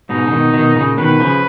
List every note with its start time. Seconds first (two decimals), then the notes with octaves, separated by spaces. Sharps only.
0.09 G#2 B2 D#4
0.27 C#3
0.31 B2 D#3
0.53 B2 D#3
0.75 A#2 C#3
0.98 B2 D#3 B4
1.20 C#3 F3